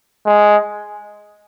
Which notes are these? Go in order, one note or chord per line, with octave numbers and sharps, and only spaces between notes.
G#3